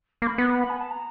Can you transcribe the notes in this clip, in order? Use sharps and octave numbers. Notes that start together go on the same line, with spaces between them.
A#3 D6
B5
B3
G#5
A5
A#5